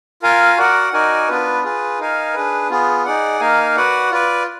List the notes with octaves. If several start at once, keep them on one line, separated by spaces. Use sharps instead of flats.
F4 A#4 F5 G#5
F#4 A#4 D5 F#5
D#4 F#4 A#4 D5 G#5
B3 D4 F4 B4
F4 G#4 B4
D#4 A#4 F5 G#5
D4 G#4 B4
B3 F4 G#4
D#4 G#4 D5 F#5
A#3 D#4 A#4 F5 G#5
F#4 B4 D5 F#5
F4 B4 D5